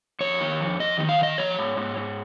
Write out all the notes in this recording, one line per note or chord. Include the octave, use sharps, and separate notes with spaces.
F2 C#5
D#3
F2
F2 D#5
D#3
F5
D#3 D#5
F3 C#5
G#2
G#2
G#2